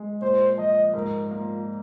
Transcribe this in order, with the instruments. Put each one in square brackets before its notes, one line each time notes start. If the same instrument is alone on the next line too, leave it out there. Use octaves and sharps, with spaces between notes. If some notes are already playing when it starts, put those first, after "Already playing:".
Already playing: [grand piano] G#3
[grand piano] A#2 [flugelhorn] C5
[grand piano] F3 [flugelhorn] D#5
[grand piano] G#2 [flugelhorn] A#4
[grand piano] A#3 [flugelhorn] F4